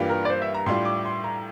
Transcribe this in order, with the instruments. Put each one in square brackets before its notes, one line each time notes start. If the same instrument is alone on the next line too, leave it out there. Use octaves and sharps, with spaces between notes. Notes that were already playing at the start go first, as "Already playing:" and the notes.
Already playing: [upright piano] G2 E3 G3 A#3 F4
[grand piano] A#4
D5
C5
E5
A#5
[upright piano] A2 G3 D4 F4 [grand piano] C6
[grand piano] D6
C6
A#5